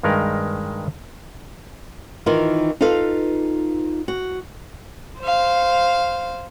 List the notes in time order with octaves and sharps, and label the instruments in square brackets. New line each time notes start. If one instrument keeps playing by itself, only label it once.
[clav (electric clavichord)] G2 D#3 G#3 D#4 A#4 B4
[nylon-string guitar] D#3 E3 D#4 F4 A#4
D#4 F4 A4 B4 F5
F#4
[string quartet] C5 F5